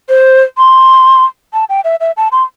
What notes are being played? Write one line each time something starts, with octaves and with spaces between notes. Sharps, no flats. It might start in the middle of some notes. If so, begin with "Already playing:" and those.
C5
C6
A5
G5
E5
E5
A5
C6